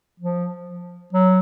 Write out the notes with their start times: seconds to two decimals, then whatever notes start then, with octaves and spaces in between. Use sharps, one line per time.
0.20 F3
1.13 F#3